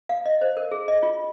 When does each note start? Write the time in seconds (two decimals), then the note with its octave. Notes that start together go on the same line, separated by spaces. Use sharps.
0.09 F5
0.26 D#5
0.41 C5
0.57 A#4
0.72 G#4
0.88 D#5
1.03 F4